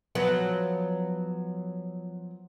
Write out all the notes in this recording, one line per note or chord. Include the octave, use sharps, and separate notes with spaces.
F3 F#3 B3